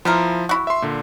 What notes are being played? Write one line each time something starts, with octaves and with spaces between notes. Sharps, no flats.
F3 B3 E4 F4 A#4
E4 F#4
E5 C6
A#2 D3